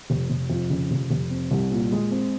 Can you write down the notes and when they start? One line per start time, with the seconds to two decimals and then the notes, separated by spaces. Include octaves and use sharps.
0.10 F1
0.30 F1
0.50 F2
0.70 C#3
0.91 F1
1.10 F1
1.30 C4
1.51 C2
1.71 A#2
1.92 G#3
2.11 C4